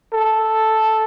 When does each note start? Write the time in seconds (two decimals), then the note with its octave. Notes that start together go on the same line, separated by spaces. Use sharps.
0.14 A4